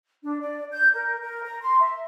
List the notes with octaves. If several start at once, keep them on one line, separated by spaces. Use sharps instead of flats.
D4
D5
G6
A#4
A#4
A#5
C6
E5